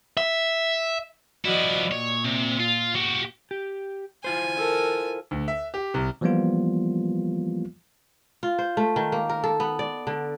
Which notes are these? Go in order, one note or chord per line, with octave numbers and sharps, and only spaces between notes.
E5
F3 E4 F#4 D5 D#5
A#2 C#5
C3
F4
F#4 G4
G4
E4 F4 C5 G#5
A4 A#4
D2
E5
G4
C2
E3 F3 G3 A#3 B3 F4
F4
C5
A3
D#3
A#3
A#4
A4
B3
D5
D3